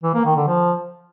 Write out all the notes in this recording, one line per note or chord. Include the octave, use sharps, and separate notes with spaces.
E3
A#3
D#3
D3
F3